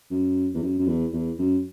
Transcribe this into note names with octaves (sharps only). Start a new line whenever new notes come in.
F#2
E2
F#2
F#2
E2
E2
F#2